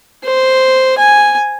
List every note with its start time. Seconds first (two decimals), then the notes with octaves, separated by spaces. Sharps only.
0.24 C5
0.98 G#5